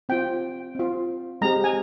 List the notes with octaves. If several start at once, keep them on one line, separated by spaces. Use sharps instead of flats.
C4 F4 G5
C4 F4
G#3 C4 G4 A#5
G#5